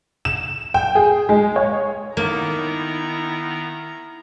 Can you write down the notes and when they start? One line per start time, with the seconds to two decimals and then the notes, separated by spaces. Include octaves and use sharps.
0.25 E7
0.74 G5
0.95 G#4
1.29 G#3
1.56 C#5
2.17 D#3 A#3 B3 D#4 E4 A#5